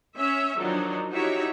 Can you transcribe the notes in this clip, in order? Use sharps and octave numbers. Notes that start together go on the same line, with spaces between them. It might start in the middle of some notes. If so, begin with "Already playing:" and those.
C#4 E5
D#3 F3 F#3 D4 D#4
D#4 E4 F#4 G4 C#5 E5